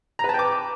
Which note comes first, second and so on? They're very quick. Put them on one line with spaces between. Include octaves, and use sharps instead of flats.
A#5 B4 A5 G5 D6